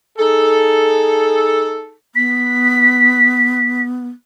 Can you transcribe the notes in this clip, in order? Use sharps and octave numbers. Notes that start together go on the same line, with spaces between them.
D#4 G#4 A4
B3 B6